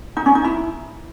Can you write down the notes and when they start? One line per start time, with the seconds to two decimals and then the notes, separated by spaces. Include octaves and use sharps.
0.17 D#4
0.26 C#4
0.35 D#4
0.44 E4